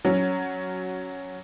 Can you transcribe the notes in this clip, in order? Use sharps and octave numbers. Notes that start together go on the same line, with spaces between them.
F#3 C#4